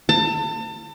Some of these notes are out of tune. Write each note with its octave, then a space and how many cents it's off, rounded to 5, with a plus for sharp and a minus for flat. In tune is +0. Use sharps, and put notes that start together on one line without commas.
A5 +35